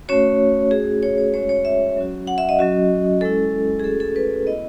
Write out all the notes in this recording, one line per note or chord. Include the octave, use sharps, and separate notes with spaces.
A3 C#4 F#4 C#5
A3 C#4 F#4 G#4
C#5
C#5
G#3 C#4 F#4 C#5
C#5
E5
F#3 C#4 F#4
F#5
E5
D#5
F#3 C#4 F#4
G#3 C#4 E4 A4
G#4
A3 C#4 F#4 A4
A4
B4
B3 E4 D#5